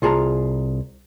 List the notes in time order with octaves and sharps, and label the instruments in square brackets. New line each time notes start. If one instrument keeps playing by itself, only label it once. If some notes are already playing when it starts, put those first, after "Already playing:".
[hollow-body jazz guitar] C2 F4 G#4 A5 A#5